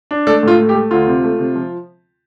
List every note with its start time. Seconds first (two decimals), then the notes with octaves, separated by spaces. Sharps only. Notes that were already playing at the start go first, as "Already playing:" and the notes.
0.11 D4
0.27 A3 A4 D5
0.43 A2 F4
0.59 A3
0.69 G4
0.74 A3
0.91 D2 F4
1.07 C3
1.24 A3
1.39 C3
1.56 F3